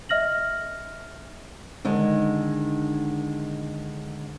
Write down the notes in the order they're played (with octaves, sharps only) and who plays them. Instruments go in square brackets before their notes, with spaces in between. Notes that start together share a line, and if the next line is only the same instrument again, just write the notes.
[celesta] D#5 E5 F6 A#6 F#7
[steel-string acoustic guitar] D3 D#3 G#3 D#4